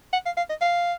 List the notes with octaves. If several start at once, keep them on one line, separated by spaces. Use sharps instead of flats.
F#5
F5
F5
D#5
F5